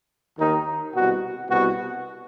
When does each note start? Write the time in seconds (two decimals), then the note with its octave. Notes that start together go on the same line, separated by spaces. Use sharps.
0.38 D#2 D#3 D#4
0.93 C2 B2 F#4
1.49 C2 B2 F#4